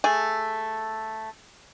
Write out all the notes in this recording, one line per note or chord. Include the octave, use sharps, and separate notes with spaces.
A3 G#4